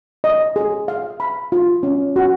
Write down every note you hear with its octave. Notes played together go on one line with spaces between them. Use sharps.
D#5
G#4
F5
B5
F4
C#4
F#4